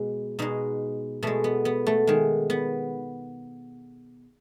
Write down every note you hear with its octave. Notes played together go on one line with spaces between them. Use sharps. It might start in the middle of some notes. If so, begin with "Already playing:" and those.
Already playing: B2 G#3
B2 G#3 D#4
B2 G#3 A3
B3
B3
A3
D#3 G#3
B3